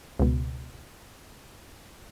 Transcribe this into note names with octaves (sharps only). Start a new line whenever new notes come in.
C#2 B2